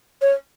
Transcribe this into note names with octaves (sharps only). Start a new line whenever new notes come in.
C#5